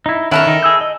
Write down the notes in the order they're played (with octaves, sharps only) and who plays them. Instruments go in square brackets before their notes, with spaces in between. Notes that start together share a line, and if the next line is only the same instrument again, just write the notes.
[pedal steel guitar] D#4 E4
[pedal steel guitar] D#3 C#4 F#5 [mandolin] E4 A4 A#4
[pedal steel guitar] D#3 D#4
G#4 E6 G6
D#5